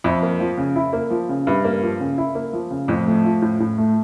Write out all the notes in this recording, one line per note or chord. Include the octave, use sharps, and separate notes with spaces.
F2 E4
A#3
F3
C#3
E4
A#3
F3
C#3
G2 E4
A#3
F3
C#3
E4
A#3
F3
C#3
F2 A2
A3
F3
A2
A2
A3